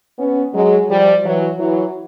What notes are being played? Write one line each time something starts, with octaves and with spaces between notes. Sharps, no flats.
B3 C#4
F#3 G#3
F3 G3
E3 F#3
E3 F#3